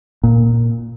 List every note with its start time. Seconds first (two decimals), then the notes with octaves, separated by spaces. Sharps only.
0.23 A#2